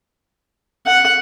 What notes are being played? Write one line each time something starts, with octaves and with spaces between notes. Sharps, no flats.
F#5